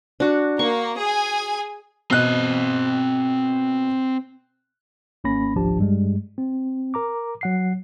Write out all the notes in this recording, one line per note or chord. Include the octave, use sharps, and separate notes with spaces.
D4 F#4
A#3 C#6
G#4 G#5
B2 C4 D#5 F#6
G#1 A#3 C#4 B5 A#6
G#1 C#2 F3 D4 G4 A5
G2 G3 G#3
C4
A#4 A#5 D6
F#3 F#5 C7